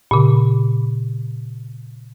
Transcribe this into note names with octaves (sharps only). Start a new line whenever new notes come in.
A#2 C#3